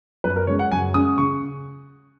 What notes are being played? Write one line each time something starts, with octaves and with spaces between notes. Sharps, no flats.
F#2 B4
A#4
C#3 G#3 C#4 C#5
F#5
F#2 G#5
C#3 G#3 C#4 D#6
C#3 C#6